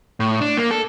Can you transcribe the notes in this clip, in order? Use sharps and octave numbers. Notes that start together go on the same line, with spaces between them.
A2
D4
A#3
A4